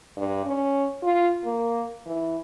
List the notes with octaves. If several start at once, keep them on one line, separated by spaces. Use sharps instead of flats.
G2
C#4
F4
A#3
E3